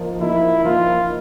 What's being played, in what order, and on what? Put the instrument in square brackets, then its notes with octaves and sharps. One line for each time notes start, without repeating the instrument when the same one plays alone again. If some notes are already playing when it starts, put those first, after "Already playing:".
Already playing: [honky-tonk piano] F3 A#3 D#4
[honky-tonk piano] F3 A#3 D#4 [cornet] E4
[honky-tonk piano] F3 A#3 D#4 [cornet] F4